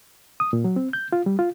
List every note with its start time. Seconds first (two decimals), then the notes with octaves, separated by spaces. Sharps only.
0.40 D#6
0.53 A#2
0.64 F#3
0.76 C4
0.93 G6
1.12 F4
1.26 G3
1.39 F4